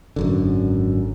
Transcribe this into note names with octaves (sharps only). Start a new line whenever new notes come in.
G#1 F#2 D3